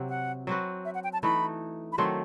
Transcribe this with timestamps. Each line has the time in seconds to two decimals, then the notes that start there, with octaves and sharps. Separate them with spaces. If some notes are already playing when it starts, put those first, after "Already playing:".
Already playing: C3 F#3 C4 F#4
0.09 F#5
0.47 F#3 C4 F#4 B4
0.85 E5
0.94 F#5
1.04 G5
1.13 A5
1.23 E3 A3 D#4 B5
1.93 B5
1.98 D#3 F#3 A3 C4 C6